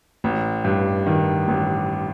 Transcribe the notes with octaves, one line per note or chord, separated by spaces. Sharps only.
A1
G2
D#3
A1